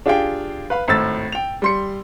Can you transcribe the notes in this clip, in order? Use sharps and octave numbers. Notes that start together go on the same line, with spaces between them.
D4 F4 G4 G#4 F5 G5
B4 F5 B5
G#1 A2 E6 A6
G5 F7
G3 C6 C#7